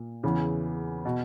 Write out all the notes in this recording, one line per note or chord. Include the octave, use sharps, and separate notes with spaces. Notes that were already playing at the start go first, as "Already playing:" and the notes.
Already playing: A#2
E2 C#3 E3
B2